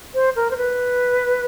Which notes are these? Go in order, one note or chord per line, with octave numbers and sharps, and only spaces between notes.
C5
A#4
C5
B4